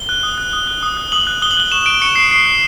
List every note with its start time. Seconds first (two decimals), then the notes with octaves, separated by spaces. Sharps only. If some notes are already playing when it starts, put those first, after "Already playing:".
Already playing: G7
0.09 F#6
0.23 D#6
0.38 F#6
0.53 D#6
0.67 F#6
0.83 D#6
0.97 F#6
1.12 D#6 F#7
1.27 F#6
1.42 D#6 G7
1.51 F#7
1.57 F#6 G7
1.72 C#6 E7
1.86 F#6 D7
2.01 C#6 C#7
2.16 F#6 C7
2.31 C#6 C7
2.46 F#6